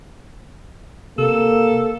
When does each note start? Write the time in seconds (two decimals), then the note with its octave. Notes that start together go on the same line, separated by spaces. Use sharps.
1.18 C3 A#3 A4